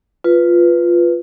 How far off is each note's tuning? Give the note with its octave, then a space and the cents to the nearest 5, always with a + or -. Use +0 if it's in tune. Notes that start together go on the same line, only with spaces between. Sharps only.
F4 +0 B4 +0